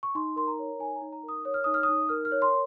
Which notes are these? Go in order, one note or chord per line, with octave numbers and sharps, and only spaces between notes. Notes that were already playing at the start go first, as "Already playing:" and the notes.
C#6
D#4 C6
A#4 C6
A#5
C#5
D#4 G#5
A#5
D#4
A#5
A#4
D#6
C#5 D#6
F6
D#4 D#6
F6
D#6
D#4
A#4 F6
F6
C#5
C6